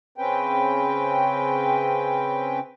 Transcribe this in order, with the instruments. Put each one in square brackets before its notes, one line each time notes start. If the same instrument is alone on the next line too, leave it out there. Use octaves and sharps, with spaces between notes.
[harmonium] C#3 C4 C#4 B4 G5